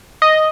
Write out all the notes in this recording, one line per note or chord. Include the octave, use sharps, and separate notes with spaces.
D#5